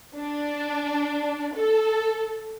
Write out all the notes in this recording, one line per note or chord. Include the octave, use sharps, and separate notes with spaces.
D4
A4